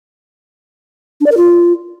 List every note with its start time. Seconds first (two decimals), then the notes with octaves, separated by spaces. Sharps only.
1.21 D4
1.26 D5
1.32 A#4
1.37 F4